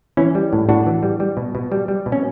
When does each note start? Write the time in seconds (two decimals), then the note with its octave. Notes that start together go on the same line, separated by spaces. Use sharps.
0.17 E3 C#4 E4
0.35 G3
0.53 A2
0.69 A2 D4 F#4
0.86 E3
1.03 G3
1.20 G3
1.37 B2
1.55 B2
1.72 G3
1.88 G3
2.06 B2
2.12 C#4